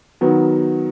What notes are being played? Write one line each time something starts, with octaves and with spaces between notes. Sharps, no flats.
D#3 F#3 B3